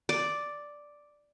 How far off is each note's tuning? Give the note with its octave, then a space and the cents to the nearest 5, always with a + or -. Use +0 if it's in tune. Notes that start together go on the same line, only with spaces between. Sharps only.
D5 +0